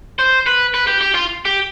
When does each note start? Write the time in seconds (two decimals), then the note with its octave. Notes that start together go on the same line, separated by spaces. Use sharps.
0.19 C5
0.46 B4
0.74 B4
0.87 G4
1.01 G4
1.15 F4
1.45 G4